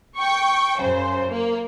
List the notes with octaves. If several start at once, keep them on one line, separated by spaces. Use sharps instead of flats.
G5 C#6
F#2 C#3 C5
A#3